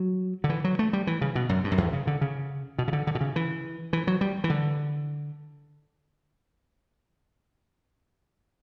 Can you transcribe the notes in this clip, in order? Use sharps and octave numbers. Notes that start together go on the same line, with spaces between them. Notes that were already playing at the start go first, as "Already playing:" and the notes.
Already playing: F#3
D3
E3
F#3
A3
G3
E3
C#3
B2
F#2
G2
F#2
E2
C#3
D3
C#3
B2
C#3
D3
D3
B2
C#3
E3
E3
F#3
G3
E3
D3